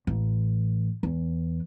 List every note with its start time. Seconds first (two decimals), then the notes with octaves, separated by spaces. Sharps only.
0.07 A1
1.03 E2